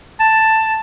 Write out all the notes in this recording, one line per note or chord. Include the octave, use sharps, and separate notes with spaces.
A5